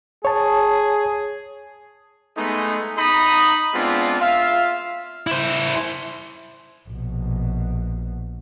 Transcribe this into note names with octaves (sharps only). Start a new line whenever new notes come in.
G#4 C#5 A5
G#3 A3 B3 D#4
D#4 A#5 B5 D#6
G#3 B3 C4 D4 F4
F4 E5 F5
E4 C5
A#1 B2